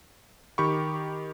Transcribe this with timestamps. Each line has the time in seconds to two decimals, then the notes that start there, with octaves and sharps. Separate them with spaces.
0.58 D#3 G4 B5 C#6